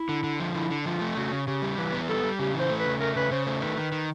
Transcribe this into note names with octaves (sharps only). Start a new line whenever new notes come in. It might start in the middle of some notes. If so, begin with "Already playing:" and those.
Already playing: E4
D3
D3
F3
D3 E4
D3
F3 F4
A3
C#3 F#4
C#3
C#3 G4
G3
E3 B4
B3
G3 A4
G3
C#3 G4
E3 C5
A3
B4
C#3
A3 A#4
C#3 B4
C#3 C5
A3 C5
D#3 B4
D#3
D#3